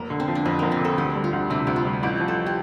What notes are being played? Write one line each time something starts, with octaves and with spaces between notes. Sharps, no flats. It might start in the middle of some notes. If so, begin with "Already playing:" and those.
Already playing: F1 A#3
D3
C4
F3
D4
F2 C4
F1 A#3
C4
D3 A4
D2 G4
G3
F4
D2
C3 D4
D2 G4
F4
G3
A1 G4
F3
A4
G4